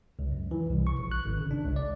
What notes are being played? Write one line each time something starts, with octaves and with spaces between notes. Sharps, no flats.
C#2
F#2
E3
C2
C#6
A#1
F#6
G#1
C#3
D4
C#2
D5